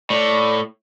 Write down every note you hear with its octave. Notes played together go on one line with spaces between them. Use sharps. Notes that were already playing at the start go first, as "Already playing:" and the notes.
A2 D5